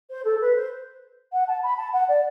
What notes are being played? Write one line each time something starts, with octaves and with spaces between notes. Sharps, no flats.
C5
A4
B4
C5
F#5
A5
B5
A5
F#5
D5